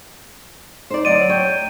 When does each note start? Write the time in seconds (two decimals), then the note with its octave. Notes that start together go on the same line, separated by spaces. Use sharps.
0.90 D#4 C5 D5
1.05 D2 F#3 D5 D#5 D7 D#7
1.29 C#5 G5